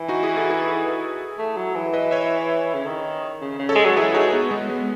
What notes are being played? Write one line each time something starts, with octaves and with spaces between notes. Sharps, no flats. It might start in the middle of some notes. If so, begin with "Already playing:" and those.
Already playing: E3
D#4 F#4
E4 G#4
F#4 A4
E4 G#4
A3
F#3
E3
B4 D#5
C#5 E5
C#3
D#3
C#3
C#3
A4 C#5
G#3
F#3
E3 G#4 B4
G#3 D#4 F#4
B3 D#4
G#3 B3
G#3 B3